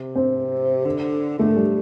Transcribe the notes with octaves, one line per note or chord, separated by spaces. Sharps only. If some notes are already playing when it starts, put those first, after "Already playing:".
Already playing: C3
C4
D3
D3 A3
G3